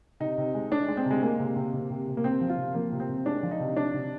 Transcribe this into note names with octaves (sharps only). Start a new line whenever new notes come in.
C3 D#4
C3
G#3
G#3 D4
G#3
C4
C3 G#3
G#3 A#3
C3
C3
C3
C3
C3
A#3
C3 C4
F3
F4
C3
F3 A#3
C3
C4
C3
G#3 D4
F3
D#4
C3
C3 D4
C3